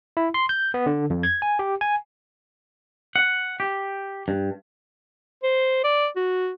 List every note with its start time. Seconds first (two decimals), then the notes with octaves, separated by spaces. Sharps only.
0.17 E4
0.34 C6
0.49 G6
0.74 B3
0.86 D3
1.10 F2
1.23 G#6
1.42 G#5
1.59 G4
1.81 G#5
3.16 F#5
3.60 G4
4.28 G2
5.43 C5
5.84 D5
6.16 F#4